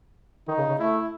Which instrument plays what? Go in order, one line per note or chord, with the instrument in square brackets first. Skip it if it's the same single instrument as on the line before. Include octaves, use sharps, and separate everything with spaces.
[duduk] D#3 [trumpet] D#4
[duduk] C#3
C#3
[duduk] A3 [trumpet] E4